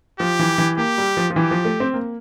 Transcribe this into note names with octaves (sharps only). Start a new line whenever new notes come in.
F3 G4
E3
E3
A#3 G4
G3
F3
F3
E3 G4
F3
A3
C4
A#3